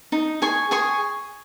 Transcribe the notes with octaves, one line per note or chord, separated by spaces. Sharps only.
D#4
G#4 G#5 C#6
G#4 G#5 C#6